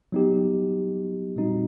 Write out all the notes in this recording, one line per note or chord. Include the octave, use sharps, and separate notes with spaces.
F#3 B3 D#4 G4
A#2 G3 C4 D#4 F#4